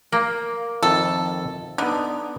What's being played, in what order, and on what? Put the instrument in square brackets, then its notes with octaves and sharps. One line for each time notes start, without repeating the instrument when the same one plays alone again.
[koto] A#3
[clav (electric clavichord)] F2 D#3 E5 [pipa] A4
[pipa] D3 [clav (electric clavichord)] B3 D4 D#4